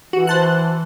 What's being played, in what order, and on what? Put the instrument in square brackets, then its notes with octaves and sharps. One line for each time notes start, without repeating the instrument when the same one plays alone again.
[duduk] E3 [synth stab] F#4
[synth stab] C5 A5 F#6